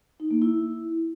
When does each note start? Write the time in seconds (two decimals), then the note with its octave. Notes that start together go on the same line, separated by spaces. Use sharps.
0.20 D#4
0.31 A#3
0.42 E4